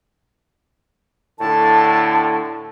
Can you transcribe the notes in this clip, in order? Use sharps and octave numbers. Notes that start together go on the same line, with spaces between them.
A2 D3 A5